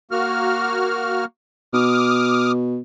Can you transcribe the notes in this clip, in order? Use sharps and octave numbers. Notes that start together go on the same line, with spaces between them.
A#3 F#4 F6
B2 D6 D#6 F6